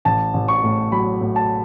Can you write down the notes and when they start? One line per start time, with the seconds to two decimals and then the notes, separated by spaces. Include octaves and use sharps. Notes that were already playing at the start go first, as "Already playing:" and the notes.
0.05 A1 A5
0.34 A1
0.48 C#6
0.64 A2
0.92 F#3 B5
1.21 A2
1.36 A5